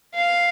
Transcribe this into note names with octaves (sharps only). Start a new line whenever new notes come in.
F5